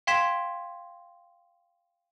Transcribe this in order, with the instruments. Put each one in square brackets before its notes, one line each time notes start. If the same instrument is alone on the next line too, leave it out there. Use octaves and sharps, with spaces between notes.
[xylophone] F5 G5 C6 G#6 B6 E7